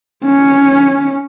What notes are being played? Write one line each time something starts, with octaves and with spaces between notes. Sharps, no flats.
C#4